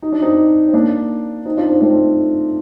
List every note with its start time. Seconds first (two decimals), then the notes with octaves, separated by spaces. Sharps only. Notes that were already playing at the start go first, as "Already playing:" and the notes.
0.02 D#4
0.12 D4
0.22 C4 D#4
0.68 C4
0.73 A#3 D4
1.45 C4 D#4
1.57 D4 F4
1.69 C4 D#4
1.81 A3 C4